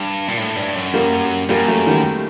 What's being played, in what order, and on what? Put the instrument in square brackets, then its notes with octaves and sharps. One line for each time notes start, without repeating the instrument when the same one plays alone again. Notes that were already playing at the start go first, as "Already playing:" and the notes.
Already playing: [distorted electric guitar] G2
A#2
A2
G2
F#2
[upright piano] G3 A#3
[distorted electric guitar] F#2 [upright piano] G3 A#3
[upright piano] F#3 A3
D#3 G3